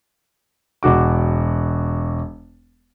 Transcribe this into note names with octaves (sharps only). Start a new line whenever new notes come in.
E1 F#4 D6